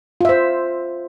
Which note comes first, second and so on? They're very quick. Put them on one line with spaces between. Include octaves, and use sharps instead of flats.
F4 E5 C5